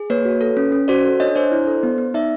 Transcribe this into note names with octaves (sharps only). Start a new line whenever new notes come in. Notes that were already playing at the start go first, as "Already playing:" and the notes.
Already playing: G#4
A#3 B4 C#5
F#4
A4
C#4
C#4
F#4 C5 D5
A4
D4 C#5 D#5
D4 C5 D5
E4
A4
B3
B3
D#4 D5 E5